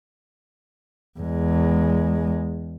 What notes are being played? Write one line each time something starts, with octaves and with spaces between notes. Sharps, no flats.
E2 G#3